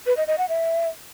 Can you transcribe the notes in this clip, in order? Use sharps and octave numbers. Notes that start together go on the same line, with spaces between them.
B4
D#5
D#5
F#5
E5